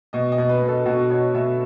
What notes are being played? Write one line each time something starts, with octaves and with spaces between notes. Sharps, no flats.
B2 D#5
D#5
B2
B4
B2
A4
B2 F#4
B2 C#5
B2 E5